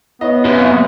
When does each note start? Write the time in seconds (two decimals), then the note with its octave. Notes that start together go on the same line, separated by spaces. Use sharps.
0.21 B3 E4 C#5 D#5
0.45 F#2 C3 B4
0.58 F5 G#5 C#7
0.71 A#3 D#6